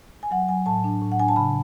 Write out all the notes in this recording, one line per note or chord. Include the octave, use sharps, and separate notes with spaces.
G#5
F#3 F#5
F#3 G#5
A2 A5
D4
A2
F#5
D4 G#5
A5
C#3 B5